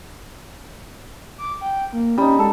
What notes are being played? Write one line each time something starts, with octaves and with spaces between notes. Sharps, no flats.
D6
G5
A#3
G3 C#4 D#4
G#3 A4